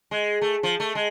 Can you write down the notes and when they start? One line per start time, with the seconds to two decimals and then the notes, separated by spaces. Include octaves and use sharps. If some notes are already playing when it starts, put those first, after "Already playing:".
0.11 G#3
0.42 A3
0.63 F3
0.80 A3
0.95 G#3